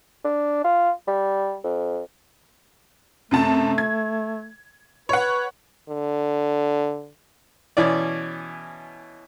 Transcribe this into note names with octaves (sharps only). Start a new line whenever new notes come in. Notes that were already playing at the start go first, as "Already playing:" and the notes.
D4
F4
G3
F2
F#2 C3 A3 A5
G#6
B4 C#5 F#5
D3
B2 E3 C#4 D5